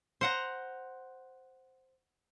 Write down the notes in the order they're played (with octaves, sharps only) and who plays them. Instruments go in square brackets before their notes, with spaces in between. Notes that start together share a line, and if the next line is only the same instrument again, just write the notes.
[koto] C5 F#5 A#5